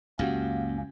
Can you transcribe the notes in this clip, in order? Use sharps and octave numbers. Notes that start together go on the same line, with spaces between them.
C#2 F#2 A#3 C#4 F#4 G4 F5